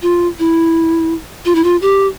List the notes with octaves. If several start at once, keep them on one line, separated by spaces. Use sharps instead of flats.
F4
E4
F4
E4
F4
G4